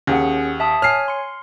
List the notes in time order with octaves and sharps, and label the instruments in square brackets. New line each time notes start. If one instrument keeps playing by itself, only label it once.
[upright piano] D#2 [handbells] C#4 G#4 F#5
[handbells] E5 A5 D#6
[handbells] C#5 G#5 [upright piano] F6 C7
[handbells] C6 C#7